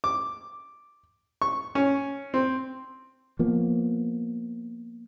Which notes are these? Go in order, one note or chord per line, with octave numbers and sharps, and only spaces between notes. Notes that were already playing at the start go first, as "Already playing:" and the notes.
D6
C#6
C#4
C4
F3 A#3 B3